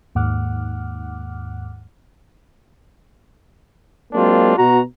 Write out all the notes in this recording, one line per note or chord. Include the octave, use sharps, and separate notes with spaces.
D#2 G#2 F#5 D6 F6 F#6
F#3 G#3 A#3 C4 D4 F4
B2 F#4 A#5